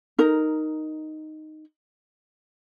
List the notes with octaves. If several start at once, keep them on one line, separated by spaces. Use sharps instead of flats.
D#4 A#4